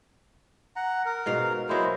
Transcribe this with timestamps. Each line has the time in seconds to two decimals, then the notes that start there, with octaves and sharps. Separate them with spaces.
0.76 F#5 A#5
1.05 A#4
1.26 G#2 B2 F5
1.69 F#3 G#3 A#3 E4 C5